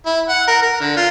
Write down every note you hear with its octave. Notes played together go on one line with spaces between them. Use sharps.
E4
F#5
A#4
A#4
D3
F4